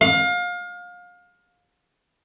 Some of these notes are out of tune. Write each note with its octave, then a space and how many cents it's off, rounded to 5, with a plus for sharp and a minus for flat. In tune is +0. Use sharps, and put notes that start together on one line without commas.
F5 +30